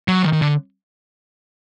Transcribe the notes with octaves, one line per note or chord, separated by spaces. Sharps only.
F#3
D#3
D#3
D3